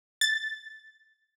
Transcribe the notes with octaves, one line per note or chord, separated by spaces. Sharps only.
A6